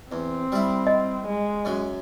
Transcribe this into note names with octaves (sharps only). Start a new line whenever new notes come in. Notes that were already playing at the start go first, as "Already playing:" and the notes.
E2 C4
G3 E4
D#5
G#3
F#2 F#3